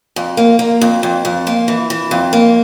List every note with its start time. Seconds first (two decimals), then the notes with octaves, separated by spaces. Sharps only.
0.16 F2
0.37 A#3
0.59 A#3
0.81 F2
1.03 F2
1.25 F2
1.47 A#3
1.68 E3
1.90 E3
2.11 F2
2.33 A#3